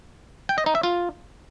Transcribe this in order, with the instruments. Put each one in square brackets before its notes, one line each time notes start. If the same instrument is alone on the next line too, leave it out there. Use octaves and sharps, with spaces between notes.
[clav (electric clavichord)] G5
D#5
D#4
E5
F4